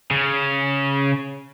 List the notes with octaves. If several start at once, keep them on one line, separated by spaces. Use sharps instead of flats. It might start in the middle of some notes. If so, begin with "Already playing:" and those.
C#3